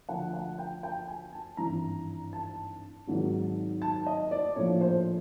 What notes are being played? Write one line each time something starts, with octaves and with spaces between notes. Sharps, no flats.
D2 D3 F3 F#5
F#5
G5
G5
G#5
A5
G#1 G2 E3 A#5
A5
G#1 G#2 D#3 F#3
A5
D#5
D5
A#1 A2 F3 C#5
C5